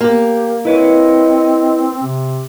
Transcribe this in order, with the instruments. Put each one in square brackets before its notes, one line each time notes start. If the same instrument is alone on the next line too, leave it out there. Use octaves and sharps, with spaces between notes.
[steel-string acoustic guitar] A#3 [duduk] G4
[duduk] C4 [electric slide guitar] E4 B4 C#5 [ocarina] D#5
[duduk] C3